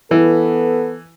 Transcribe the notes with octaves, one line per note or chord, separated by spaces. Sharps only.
E3 B3 A4